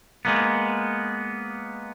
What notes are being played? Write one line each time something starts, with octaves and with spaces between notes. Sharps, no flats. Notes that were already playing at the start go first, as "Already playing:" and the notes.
G#3 A#3 B3